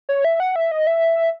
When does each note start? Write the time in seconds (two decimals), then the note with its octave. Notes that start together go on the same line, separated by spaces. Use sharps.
0.09 C#5
0.25 E5
0.40 F#5
0.56 E5
0.71 D#5
0.87 E5